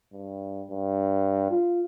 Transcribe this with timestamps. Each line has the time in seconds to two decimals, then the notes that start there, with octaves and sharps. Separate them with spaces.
0.13 G2
0.71 G2
1.51 F4